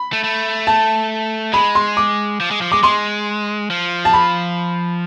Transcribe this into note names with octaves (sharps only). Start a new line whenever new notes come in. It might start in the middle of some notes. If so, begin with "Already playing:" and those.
Already playing: B5
A3
A3
A5
G#3 B5
C6
D6
F3
G#3
F3
G#3 D6
G#3 C6
F3
A5
B5